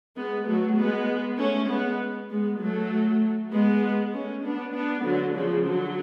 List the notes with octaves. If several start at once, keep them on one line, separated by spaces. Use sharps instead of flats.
G#3 B3
F#3 A3
G#3 B3
A3 C#4
G#3 B3
G#3 B3
F#3 A3
G#3 B3
A3 C#4
B3 D4
B3 D4
D3 F#3
C#3 F3
D3 F#3